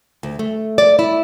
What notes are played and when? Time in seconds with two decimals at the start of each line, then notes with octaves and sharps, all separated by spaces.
0.23 D2
0.39 A3
0.78 D5
0.99 E4